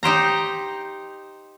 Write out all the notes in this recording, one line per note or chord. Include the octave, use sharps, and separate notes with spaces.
D#4 G4 C5 A#5